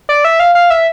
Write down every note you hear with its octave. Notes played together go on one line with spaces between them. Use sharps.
D5
E5
F5
F5
E5